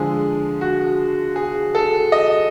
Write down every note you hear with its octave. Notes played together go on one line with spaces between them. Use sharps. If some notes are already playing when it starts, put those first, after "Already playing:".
Already playing: D3 F3 G#3 G#4
F#4
G#4
A4
D#5